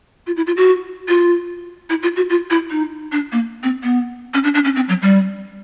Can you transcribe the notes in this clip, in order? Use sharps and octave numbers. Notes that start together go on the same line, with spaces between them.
F4
E4
F4
F#4
F4
E4
F4
F#4
F4
E4
D#4
D4
A#3
C4
B3
C#4
D4
D4
C#4
C4
F#3
G3